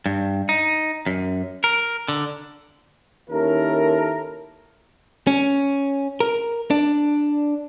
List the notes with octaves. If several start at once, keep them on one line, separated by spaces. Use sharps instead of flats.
G2
D#4
F#2
A#4
D3
D#2 C#4 E4 A4 A#4
C#4
A#4
D4